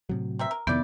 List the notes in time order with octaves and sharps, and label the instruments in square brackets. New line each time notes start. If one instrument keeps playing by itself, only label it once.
[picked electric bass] A2 C3 F#3
[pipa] C4 A#4 E5
A#4
[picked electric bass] F2 C3 D#3 [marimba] B3 G6 [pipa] E4 D5